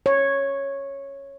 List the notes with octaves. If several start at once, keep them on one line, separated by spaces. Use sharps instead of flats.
C#5